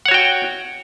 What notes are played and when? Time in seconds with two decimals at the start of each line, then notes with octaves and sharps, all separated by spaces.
0.06 F#5
0.08 C#5
0.11 F#4
0.14 G5